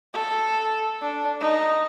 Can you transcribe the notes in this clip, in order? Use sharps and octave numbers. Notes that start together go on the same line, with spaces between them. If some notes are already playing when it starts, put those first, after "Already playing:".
A4
D4
D#4